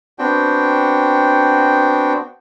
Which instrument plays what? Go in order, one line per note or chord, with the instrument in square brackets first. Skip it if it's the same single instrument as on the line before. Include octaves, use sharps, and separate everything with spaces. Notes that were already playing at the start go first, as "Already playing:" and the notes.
[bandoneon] B3 C4 D4 F#4 G5